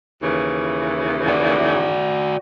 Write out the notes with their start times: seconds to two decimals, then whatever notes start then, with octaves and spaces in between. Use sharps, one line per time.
0.22 D#2 C#3 E3
1.28 F#4 D5